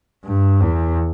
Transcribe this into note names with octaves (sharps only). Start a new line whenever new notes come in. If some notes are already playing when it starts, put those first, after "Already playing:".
G2
E2